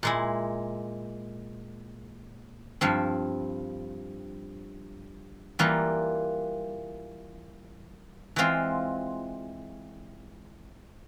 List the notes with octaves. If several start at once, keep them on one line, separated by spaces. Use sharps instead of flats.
A#2 G#3 E4
G2 F3 C4
E3 G3 A#3 F4
E3 G#3 C4 F4